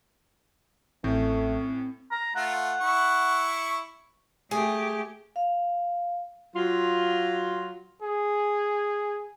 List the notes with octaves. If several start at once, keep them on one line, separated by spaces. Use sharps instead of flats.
A1 A2 A3 C4 C#4
A#5
A3 F4 F#5
E4 C#6
A3 G4 G#4
F5
F#3 F4
G#4